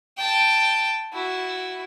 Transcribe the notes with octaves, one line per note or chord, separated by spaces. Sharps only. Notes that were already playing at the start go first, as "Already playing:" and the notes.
G5 A5
E4 F#4